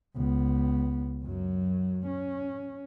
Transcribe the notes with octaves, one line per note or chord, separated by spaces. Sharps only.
C#2 B3
F#2 F#3
C#4